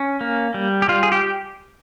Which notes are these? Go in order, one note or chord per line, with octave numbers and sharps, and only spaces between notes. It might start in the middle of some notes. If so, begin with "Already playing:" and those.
Already playing: C#4
A#3
G3
G4
G3 F4
G#4
G4